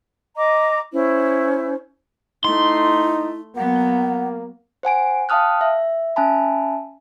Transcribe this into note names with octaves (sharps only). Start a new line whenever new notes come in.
D#5 A#5 D6
C#4 E4 C5
A3 D#4 E4 C6
F#3 A#3 B3 F#5
C5 F#5 G#5 D7
F5 G5 A5 D#6 F6 F#6
E5
C#4 E5 G#5 A5 B5